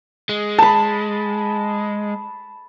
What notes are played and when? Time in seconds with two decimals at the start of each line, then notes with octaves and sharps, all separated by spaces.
0.29 G#3
0.59 A5 B5